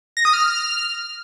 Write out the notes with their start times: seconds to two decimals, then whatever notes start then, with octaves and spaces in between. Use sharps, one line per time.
0.17 A#6
0.25 D#6
0.33 F6